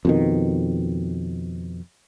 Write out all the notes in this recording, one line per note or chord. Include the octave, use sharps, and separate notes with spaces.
F2 B2 D#3